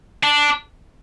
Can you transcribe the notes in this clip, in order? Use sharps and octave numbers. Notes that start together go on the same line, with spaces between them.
D4